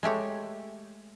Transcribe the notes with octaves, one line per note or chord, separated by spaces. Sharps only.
G#3 A3 G4 C#5